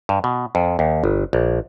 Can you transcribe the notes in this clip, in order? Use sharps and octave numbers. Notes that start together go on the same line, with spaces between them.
G2
B2
F2
D#2
G1
A#1